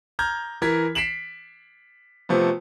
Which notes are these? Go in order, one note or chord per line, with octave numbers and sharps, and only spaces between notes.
A#5 F6 G6 G#6
E3 A#4 G#6 B6
B6 C7 D7 E7 F#7
C3 F3 A3 B3